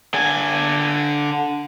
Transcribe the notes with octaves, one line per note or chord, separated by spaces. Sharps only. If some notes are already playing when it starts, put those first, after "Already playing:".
D3 G#5